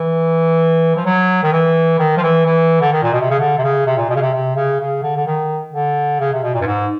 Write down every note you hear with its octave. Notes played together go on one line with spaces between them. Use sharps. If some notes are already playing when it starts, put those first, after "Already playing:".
Already playing: E3
F3
F#3
D#3
E3
D#3
F3
E3
E3
D3
D#3
A#2
B2
C3
C#3
D3
C3
C#3
C3
A#2
B2
C#3
C3
C3
C#3
C#3
D3
D3
D#3
D3
C#3
C3
B2
A#2
G2
G#2